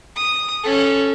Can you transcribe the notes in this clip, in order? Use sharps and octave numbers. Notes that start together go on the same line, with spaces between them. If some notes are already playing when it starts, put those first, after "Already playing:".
D#6
C#4 A4